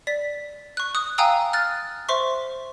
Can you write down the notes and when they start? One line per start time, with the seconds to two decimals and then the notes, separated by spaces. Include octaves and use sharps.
0.07 D5 B6
0.77 C#6 F#6
0.95 D#6 F#6
1.18 F5 G5 G#5 A#5 D#6 E6
1.53 F6 F#6 A6
2.09 C5 E5 C6 C#6